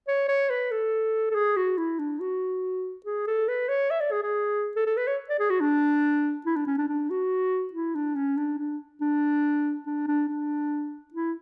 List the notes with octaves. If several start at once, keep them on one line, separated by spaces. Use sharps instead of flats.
C#5
C#5
B4
A4
A4
G#4
F#4
E4
D4
F#4
G#4
A4
B4
C#5
E5
D5
G#4
G#4
A4
A4
B4
C#5
D5
G#4
F#4
D4
E4
D4
C#4
D4
D4
F#4
E4
D4
C#4
D4
D4
D4
D4
D4
D4
E4